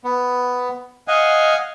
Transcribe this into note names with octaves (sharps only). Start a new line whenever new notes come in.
B3
D#5 F5 F#5 G#5